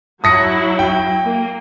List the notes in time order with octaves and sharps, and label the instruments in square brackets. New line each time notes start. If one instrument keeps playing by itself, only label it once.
[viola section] F#3 E4 [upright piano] D#6 A#6 C#7
[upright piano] G5
[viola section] A#3